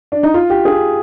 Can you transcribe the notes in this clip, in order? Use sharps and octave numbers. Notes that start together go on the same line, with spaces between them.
D4
D#4
F4
G4
G#4